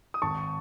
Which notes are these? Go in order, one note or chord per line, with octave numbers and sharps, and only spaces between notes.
D#6
G#1 A5 C#6